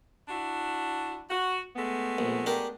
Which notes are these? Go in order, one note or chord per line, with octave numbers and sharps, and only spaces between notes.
D4 E4 F#4
F#4
G#3 A3 B3
A#1
D4 G4 A#4